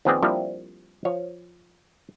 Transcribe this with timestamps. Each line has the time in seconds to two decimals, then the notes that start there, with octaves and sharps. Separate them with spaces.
0.05 D#2 F3 B3 C4 G#4 D5
0.22 F3 G3 A#3 C4 D4 E4
1.05 F3 C#5